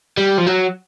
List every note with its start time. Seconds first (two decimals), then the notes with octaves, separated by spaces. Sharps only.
0.18 G3
0.38 F3
0.47 F#3